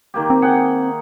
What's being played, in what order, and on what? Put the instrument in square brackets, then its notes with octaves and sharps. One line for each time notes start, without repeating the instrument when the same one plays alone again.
[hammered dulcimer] D#3 A#3 G4
[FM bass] C4
[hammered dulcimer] G#4 F#5 G5